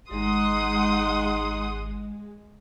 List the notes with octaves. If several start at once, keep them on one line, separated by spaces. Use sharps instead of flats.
G#1 G#3 D#4 F#5 C6 D#6